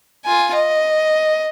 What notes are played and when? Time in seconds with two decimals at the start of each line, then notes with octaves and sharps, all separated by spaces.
0.25 F4 G#5
0.54 D#5